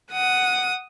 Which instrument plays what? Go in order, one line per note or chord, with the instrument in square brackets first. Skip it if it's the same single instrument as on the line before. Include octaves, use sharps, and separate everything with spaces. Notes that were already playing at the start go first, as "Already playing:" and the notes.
[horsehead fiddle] F#5 [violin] D#6